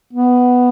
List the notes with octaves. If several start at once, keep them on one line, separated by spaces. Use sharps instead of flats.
B3